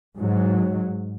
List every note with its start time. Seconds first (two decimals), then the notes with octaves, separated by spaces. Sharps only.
0.16 G#2 F#3